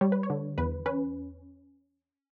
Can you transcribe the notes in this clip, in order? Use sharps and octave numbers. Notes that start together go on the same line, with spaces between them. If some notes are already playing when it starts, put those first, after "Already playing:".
G3 C#5
B4
C#5
D3
E2 B4
C#4 B4